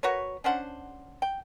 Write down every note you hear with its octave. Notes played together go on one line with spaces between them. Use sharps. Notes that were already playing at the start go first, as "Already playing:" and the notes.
F#4 A#4 B4 C#5
C#4 D4 C5 F#5
G5